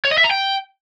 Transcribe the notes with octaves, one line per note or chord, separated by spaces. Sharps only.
C#5
D#5
E5
A#5
G5